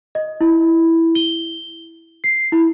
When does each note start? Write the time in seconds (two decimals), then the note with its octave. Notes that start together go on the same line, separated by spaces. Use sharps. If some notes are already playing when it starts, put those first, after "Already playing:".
0.15 D#5
0.41 E4
1.15 G7
2.24 C7
2.52 E4